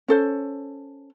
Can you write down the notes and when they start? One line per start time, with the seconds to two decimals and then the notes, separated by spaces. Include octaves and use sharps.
0.08 C#4 A4 C5